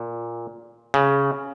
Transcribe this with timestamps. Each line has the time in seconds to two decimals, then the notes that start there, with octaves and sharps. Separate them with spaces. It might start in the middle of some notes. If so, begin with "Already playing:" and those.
Already playing: A#2
0.94 C#3